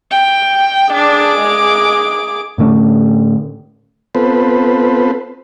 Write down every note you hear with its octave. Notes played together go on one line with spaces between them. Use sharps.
G5
D4 G#4 D6
G#3
A2 D3 A3 C#4
B3 C4 F4 A4 B4 C5